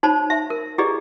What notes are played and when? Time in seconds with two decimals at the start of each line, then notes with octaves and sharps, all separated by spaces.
0.03 D#4 C5 C#5 A5 B5
0.30 E5
0.50 A#4
0.78 E4 G4 G#4 B4 D5 D#5